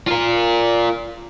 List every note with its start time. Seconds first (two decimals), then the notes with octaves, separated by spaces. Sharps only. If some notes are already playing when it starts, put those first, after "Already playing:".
0.07 F4 A#4